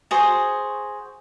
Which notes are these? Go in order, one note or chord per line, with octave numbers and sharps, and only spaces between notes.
F#4 G#4 C5